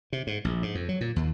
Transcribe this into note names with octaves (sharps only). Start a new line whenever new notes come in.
C3
G#2
A#1
G#2
F2
F#3
A#2
D#2